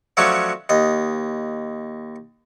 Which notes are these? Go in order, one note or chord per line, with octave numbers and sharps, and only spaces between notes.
F3 F#3 A3 C#4 D4
D#2 D#5